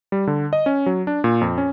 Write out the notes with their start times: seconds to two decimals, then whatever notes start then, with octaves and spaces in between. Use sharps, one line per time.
0.12 G3
0.27 D3
0.53 D#5
0.66 C#4
0.86 F#3
1.07 D4
1.24 A#2
1.41 F2
1.58 C#4